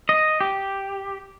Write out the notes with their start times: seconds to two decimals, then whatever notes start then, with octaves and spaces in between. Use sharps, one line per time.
0.09 D#5
0.41 G4